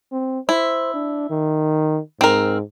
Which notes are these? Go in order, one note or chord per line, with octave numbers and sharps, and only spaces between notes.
C4
E4 C5
D4
D#3
G#2 C4 A#4